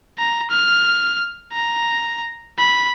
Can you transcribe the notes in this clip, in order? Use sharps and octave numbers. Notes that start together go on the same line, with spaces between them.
A#5
F6
A#5
B5